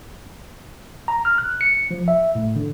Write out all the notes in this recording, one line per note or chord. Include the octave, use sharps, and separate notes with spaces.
A#5
F6
F#6
C#7
F3
E5
A2
D3